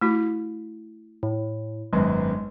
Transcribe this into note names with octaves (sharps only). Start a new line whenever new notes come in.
A3 E4 F#4
A2
G#1 F#2 G#3 B3